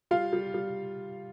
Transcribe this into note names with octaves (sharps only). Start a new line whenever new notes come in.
G3 F4 F5
G3
G3